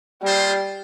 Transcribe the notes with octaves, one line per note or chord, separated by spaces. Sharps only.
G3 A#3 D4 F4 G#4 C5